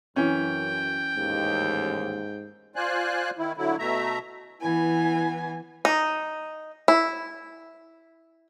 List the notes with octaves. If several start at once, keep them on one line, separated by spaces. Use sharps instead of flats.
F#2 E3 C#4 G5
A1 D#2 G#2
F4 C5 D5 G#5 F#6
D#3 E4
D3 F#3 E4
B2 A3 E5 A#5
E3 B3 E4 G#5
D#4
E4